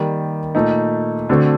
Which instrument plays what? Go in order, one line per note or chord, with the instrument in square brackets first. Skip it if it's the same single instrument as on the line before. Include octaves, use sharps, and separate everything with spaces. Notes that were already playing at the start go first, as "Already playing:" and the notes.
Already playing: [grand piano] D#3 G3 A#3
A#2 A3 D#4
D3 A3 C4 F#4